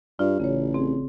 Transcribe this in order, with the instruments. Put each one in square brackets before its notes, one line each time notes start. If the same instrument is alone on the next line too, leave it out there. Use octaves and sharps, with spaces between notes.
[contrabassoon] G2 [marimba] F4 G4 D5
[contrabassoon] A1 [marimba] C#3 C#5
[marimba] C4 G#4